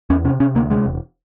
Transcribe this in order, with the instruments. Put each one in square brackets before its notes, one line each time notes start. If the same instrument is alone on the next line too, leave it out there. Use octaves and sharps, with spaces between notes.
[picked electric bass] E2 C#4
C3 C#4
C3 C#4
D2 A#3
C3 G#3
E1